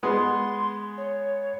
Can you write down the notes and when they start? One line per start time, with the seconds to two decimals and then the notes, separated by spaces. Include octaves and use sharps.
0.03 G#3 B3 G#4 C6
0.98 C#5